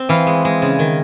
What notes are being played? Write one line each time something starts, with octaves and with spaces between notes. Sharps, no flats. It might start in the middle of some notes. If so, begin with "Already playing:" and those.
Already playing: C4
E3 F5
G#3
G#3
C#3
D#3